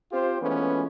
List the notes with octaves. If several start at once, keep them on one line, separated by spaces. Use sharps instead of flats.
C4 F4 G4 C5
E3 F3 G#3 A3 B3 C#4